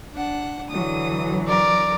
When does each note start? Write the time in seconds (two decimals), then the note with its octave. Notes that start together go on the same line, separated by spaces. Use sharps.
0.14 D4 F#5
0.71 D3 E3 F#3 D#6
1.48 A#4 D5